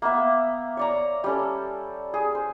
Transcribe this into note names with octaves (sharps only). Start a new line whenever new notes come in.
A#3 B3 E5
C#5 D5 A#5
G3 C#4 A4
G#4
C5